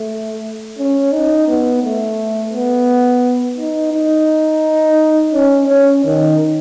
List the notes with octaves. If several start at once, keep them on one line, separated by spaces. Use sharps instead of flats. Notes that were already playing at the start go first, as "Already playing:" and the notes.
Already playing: A3
C#4
D#4
B3
A3
B3
D#4
D#4
C#4
C#4
D#3